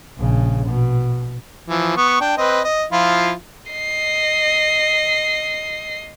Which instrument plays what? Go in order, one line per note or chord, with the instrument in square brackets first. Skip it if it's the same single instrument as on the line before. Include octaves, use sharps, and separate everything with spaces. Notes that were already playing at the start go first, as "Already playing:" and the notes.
[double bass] A#1 C#3
B2
[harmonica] E3 F3
B3 C#6
D4 G5
C4 B4 D#5
D#5
F3 E4 F4
[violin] D#5 C7